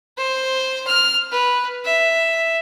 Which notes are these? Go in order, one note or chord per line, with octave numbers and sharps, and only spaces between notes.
C5
F6
B4
E5